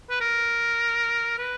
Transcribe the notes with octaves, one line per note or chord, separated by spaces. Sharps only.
B4
A#4
B4